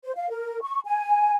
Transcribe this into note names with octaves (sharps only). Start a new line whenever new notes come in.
C5
F5
A#4
C#6
G#5